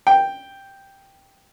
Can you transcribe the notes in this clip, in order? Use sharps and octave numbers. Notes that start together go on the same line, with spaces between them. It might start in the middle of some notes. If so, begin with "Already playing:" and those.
G5